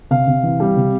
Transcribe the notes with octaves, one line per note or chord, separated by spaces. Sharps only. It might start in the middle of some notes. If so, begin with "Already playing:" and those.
C3 F5
C3
E3
G3
C3